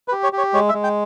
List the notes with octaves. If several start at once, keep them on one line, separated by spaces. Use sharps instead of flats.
B4
G4
C#5
G4
C#5
G#3 C#5
E5
G#3
G5